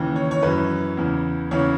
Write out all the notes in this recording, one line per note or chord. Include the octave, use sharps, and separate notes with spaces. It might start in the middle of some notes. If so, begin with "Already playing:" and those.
Already playing: D#2 C#3 E3
C#5
C#5
F#2 E3 B4
E2 C#3 E3
E2 C#3 E3 C#5